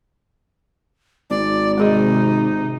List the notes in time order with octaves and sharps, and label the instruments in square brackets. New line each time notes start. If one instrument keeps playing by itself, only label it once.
[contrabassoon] G#1 [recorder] D5
[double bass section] C3 [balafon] G#3 G#4 D#5 [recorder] D#4